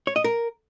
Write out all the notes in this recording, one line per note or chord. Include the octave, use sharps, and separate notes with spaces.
C#5
D#5
A#4